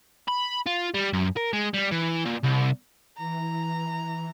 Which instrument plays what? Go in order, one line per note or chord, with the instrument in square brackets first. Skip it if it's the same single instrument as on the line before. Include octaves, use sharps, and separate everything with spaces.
[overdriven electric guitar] B5
F4
G3
F#2
A#4
G#3
G3
E3
A#2
C2
[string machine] E3 [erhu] A#5